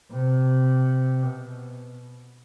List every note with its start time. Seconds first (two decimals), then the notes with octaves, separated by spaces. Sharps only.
0.12 C3
1.23 B2